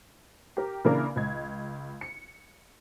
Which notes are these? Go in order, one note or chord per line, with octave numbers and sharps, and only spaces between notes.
G4 A#4
C#3 E3 A#3 D4 A#4
C#2 D#5 G#6
C#7